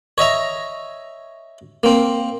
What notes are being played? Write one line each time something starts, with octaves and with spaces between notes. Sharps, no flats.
C#5 D#5 E5 A#5
A#3 C4